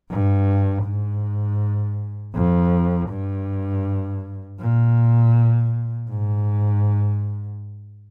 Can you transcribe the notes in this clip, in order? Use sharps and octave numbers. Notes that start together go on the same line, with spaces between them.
G2
G#2
F2
G2
A#2
G#2